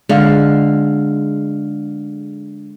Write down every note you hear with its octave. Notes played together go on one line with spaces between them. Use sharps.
D3 G#3 F5